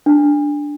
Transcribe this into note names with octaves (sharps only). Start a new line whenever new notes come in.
D4